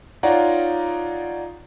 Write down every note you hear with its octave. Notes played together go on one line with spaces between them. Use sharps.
D#4 F4 C#5 D5 F#5 A#5